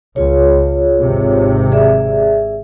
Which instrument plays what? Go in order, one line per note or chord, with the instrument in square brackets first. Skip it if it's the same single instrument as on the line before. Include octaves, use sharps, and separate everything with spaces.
[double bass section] C#2 [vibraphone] F4 G#4 C#5
[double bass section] G#1 C3
[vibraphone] G#4 D5 E5